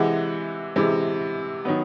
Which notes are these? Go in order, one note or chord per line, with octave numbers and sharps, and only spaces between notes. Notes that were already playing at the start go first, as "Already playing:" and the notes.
Already playing: C3 E3 G#3 F#5
C3 E3 G#3
D#3 F#3 B3